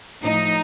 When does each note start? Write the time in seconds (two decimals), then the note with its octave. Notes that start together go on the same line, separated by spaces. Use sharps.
0.22 A2 F3 D#4